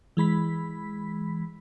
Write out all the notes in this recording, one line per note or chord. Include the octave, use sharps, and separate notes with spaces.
E3 G#3 B5 B6